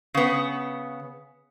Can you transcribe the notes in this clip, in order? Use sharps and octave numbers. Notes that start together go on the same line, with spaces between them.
C#3 B3